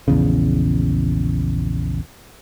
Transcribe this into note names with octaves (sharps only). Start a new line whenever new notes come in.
A#1 E2 C#3